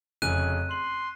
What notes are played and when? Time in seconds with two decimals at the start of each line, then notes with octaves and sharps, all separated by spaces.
0.22 F1 C#3 G#5 F#6 D#7
0.71 C6 F#7